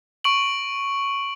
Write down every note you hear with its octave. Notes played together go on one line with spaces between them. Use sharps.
C#6 D7 F#7